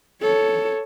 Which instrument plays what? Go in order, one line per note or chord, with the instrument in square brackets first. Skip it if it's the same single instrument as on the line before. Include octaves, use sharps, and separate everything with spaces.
[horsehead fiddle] A4 C#5